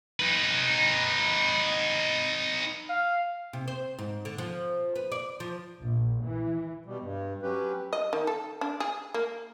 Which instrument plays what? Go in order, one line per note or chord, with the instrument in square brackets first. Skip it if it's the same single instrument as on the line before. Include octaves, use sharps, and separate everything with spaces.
[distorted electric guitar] D#4 B4
[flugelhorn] F5
[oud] C3
C5
G#2
D3
F3
B4
D5
F3
[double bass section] A#1
E3
[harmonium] B2 G3
G2
F#3 C#4 G4 B4
[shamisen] D#5
D#3
A4
D4
G#4
A#3